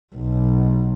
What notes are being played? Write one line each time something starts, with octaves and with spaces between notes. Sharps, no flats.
B1